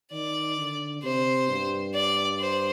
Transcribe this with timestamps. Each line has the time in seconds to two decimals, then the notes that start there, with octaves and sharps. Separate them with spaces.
0.12 D#3 D5
0.57 D3
1.03 C3 C5
1.49 G2
1.94 D5
2.40 C5